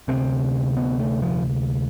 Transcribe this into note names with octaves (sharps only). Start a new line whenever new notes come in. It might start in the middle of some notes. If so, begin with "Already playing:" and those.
D2 C3 C4
B3
A3
F3